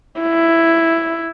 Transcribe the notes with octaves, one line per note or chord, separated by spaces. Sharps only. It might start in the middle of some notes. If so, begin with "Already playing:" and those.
E4